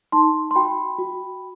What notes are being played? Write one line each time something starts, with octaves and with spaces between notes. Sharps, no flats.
D#4 A5 C6
C6
F#4 G5 B5
F#4